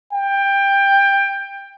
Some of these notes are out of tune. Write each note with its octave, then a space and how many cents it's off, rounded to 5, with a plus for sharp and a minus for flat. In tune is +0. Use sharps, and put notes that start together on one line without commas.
G5 +15